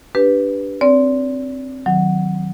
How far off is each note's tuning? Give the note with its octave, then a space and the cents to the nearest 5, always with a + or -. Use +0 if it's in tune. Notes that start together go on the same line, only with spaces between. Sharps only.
D4 -10 G4 +0 B4 +0
C4 +0 D5 -40
D#3 +0 F#3 +0